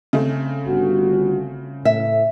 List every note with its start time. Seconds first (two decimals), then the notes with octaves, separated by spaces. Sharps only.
0.13 C#3 A3 C4
0.66 G1 F#4
1.85 A2 E5